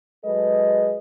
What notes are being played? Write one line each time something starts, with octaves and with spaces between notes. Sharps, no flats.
F#3 G#3 G#4 A4 B4 D#5